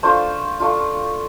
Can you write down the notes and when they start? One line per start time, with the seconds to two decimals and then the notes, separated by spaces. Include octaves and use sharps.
0.03 A3 D4 F4 C5
0.60 A3 D4 F4